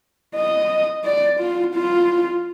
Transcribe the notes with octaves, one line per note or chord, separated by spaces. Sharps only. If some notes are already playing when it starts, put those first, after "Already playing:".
D#5
D5
F4
F4